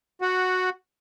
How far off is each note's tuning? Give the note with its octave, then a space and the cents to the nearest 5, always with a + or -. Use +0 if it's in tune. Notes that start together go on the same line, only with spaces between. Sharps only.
F#4 -5 F#5 +0